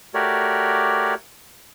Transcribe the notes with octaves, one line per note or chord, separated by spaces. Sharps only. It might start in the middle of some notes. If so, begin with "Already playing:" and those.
A3 F#4 G4 A#4 C#5 D5